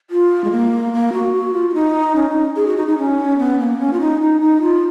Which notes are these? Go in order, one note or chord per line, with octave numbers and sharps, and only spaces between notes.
F4
G#3
A#3
A#3
F#4
F#4
F4
F4
D#4
C#4
D#4
G#4
F#4
D#4
D#4
C#4
B3
A#3
C#4
F4
D#4
D#4
D#4
F4